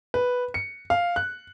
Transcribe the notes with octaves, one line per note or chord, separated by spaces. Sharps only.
B4
C#7
F5
F#6